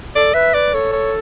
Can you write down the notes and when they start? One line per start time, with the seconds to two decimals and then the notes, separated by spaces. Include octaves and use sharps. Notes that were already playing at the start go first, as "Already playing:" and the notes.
0.16 A4 D5
0.34 B4 E5
0.54 B4 D5
0.74 A4 C#5
0.92 C#5